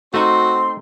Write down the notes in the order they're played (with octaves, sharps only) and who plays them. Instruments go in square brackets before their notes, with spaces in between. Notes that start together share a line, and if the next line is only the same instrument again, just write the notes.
[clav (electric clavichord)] A3 D#4 [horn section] C4 C6 [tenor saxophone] F#4